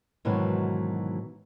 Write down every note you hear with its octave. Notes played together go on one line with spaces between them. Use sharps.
G#2 B2 D#3 E3 F#3